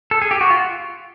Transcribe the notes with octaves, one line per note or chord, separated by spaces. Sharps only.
A4
G#4
G4
F#4
F4